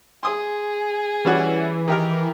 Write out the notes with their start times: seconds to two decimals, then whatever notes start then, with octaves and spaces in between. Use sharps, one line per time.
0.23 G#4 C6 D#6
1.25 E3 G3 C#4 F#4
1.88 D#3 G4 A#4